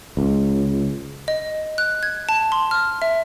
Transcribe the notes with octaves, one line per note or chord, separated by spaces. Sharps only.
C#2
D#5
F#6
G#6
A5
C6
F6
E5